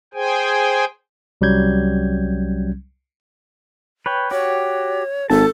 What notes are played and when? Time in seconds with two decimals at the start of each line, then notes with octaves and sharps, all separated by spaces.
0.14 G#4 C5 G5 G#5
1.41 C2 F#3 G3 C#4 G6 G#6
4.06 B4 C#5 G5
4.31 F#4 G4 C#5
5.30 G#1 A4 A5